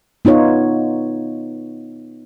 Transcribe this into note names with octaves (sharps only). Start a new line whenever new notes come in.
B3 D#4 F4 C#5